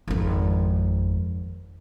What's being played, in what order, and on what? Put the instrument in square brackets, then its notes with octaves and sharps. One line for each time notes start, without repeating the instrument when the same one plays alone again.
[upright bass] G#1 F2